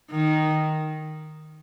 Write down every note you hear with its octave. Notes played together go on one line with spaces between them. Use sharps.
D#3